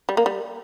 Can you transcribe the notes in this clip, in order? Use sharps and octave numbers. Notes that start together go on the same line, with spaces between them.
G3
A#3
G3